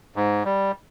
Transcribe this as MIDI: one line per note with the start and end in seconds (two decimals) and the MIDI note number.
0.16 0.43 44
0.45 0.72 55